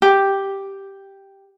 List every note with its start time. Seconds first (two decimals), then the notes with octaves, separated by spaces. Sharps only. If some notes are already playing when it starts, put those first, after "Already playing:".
0.02 G4